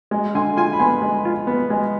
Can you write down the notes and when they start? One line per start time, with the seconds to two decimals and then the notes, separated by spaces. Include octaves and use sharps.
0.11 G#3
0.34 D3 G#5 C6
0.57 F4 G#5 C6
0.73 B5
0.79 B3 G#5 C6
1.02 G#3
1.25 F4
1.47 B3
1.70 G#3